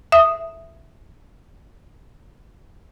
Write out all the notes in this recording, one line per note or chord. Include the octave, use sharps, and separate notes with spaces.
E5 D#6